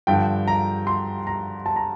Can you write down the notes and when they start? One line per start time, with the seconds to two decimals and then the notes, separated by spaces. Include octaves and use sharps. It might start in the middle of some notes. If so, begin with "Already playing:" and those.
0.07 G2 D3 F3 G5
0.48 A#5
0.87 C6
1.27 A#5
1.66 A5
1.76 A#5